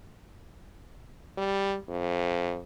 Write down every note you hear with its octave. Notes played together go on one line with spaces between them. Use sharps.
G3
F2